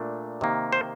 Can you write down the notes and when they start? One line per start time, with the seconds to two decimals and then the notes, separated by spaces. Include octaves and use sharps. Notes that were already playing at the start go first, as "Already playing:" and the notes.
Already playing: A#2 A3 D4
0.41 C3 D#3 A#3
0.73 C5